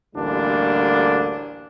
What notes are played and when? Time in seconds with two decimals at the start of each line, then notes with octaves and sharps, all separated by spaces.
0.16 A1 D2 D3 G3 A#3 D4